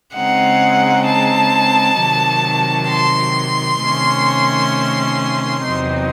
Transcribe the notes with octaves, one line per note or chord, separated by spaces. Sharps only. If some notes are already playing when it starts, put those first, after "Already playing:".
C#3 G#3 C4 D#4 F#5
A5
C3 D#3 F#3
C6
C3 D#3 A3 C#4
E2 C3 F#3 C4 D#4